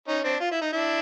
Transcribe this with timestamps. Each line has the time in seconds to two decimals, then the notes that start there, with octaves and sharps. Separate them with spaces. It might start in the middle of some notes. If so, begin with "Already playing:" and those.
0.08 C#4 D#4
0.24 C4 D4
0.40 F4
0.51 E4
0.62 D#4
0.73 D4 E4